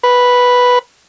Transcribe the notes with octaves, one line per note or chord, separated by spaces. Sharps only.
B4